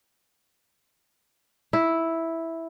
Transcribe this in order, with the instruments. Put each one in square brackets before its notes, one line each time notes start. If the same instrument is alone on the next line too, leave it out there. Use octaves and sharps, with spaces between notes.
[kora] E4